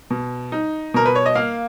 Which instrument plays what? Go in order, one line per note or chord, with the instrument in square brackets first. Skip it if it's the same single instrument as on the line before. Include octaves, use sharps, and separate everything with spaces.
[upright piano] B2
D#4
B2 A#4
B4
C#5
D#5
A#3 F5